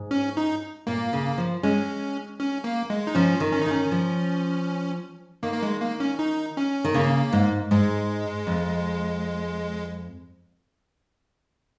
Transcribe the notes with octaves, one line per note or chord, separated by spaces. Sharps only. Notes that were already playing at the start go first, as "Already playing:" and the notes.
Already playing: G#2
C#4
D#4
A#2 A#3
C#3
F3
G#3 C#4
C#4
A#3
G#3
D#4
F3 C#4
D#3
C#4
D#4
D#3 C#4
F3
D#3 A#3
A#3
G#3
A#3
C#4
D#4
C#4
D#3
C#3 A#3
G#2
G#2 G#3
F2